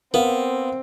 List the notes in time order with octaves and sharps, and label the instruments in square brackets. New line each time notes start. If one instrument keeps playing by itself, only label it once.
[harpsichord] B3 [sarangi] C4 [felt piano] A#4 F5